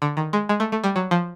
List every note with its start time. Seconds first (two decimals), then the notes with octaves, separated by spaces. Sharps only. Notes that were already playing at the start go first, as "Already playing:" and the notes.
0.02 D3
0.17 D#3
0.33 G#3
0.49 G#3
0.60 A3
0.72 A3
0.84 G3
0.96 F#3
1.11 F3